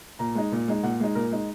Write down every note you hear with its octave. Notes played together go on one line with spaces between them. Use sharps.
A#2 A#5
G#3 D#4
A#2
G#3 D#4
A#2 F#5
G#3 D#4
A#2 A#4
G#3 D#4